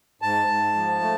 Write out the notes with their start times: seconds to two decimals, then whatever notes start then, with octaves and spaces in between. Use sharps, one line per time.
0.22 G#2 A5
0.48 G#2
0.75 F3
1.01 A3